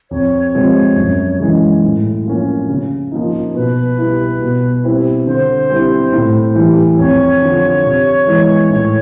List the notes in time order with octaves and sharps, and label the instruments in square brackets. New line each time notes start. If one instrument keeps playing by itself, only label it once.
[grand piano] F2 [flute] C#5
[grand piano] C3 F3 G#3 C4
F#2
C#3 E3 G#3
A2
F3 A#3 C#4
C#3
F3 A#3 D#4
[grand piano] B2 [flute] B4
[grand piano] G3 B3 E4
B2
G3 C4 E4
[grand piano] D3 [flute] C5
[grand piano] G3 C4 E4
A2
E3 G3
[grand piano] F2 [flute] C#5
[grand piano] D3 F3
C3
E3 G#3 B3
A2